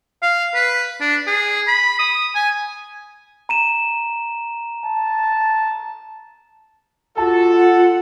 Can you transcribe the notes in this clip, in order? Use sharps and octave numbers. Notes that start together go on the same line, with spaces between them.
F5
B4
D4
G#4
B5
D#6
G#5
A#5 D#7 E7
A5
F4 F#4 A4 A5
F#5